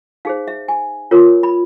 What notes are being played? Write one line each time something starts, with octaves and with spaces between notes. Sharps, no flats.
D#4 G#4 C5 F5
E5
G#5
F4 A#4 C#5
B5